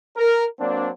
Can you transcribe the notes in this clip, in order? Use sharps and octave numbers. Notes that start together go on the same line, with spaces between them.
A#4
F#3 A#3 C4 D4